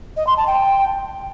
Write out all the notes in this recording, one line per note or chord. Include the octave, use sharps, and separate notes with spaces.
D#5
C6
A5
G5